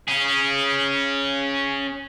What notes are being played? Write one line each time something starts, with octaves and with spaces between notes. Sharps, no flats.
C#4 G#4